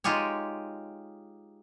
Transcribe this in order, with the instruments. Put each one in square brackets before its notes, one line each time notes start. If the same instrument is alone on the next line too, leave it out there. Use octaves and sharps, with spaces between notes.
[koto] G#3 D#4 F4 G4 G#4 C#5